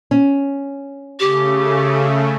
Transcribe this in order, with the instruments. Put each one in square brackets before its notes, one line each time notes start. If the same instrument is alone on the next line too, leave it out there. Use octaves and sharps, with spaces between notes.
[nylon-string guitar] C#4
[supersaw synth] C#3 A3 [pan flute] G4